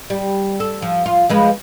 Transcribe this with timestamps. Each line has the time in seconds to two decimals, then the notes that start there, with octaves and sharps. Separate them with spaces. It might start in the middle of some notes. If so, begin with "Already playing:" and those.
0.10 G3
0.60 A4
0.82 F3
1.06 F4
1.29 F3 G#3 B4